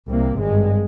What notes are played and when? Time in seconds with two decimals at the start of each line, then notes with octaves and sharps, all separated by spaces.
0.09 C2 C3 A#3
0.38 G#1 G2 G#3